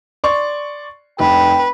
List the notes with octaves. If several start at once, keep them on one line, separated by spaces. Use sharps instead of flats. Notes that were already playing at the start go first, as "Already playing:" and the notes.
D5 C6 C#6
F1 B4 G5